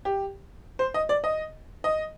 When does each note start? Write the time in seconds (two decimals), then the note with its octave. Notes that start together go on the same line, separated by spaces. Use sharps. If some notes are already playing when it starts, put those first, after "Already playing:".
0.05 G4
0.79 C5
0.94 D#5
1.09 D5
1.24 D#5
1.84 D#5